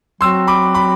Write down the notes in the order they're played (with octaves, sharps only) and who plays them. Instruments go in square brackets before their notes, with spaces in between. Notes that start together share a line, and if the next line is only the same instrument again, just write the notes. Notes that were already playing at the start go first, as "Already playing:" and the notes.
[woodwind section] F#3 C4 F#4 [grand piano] C6 E6
[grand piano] B5 D6
B5 D6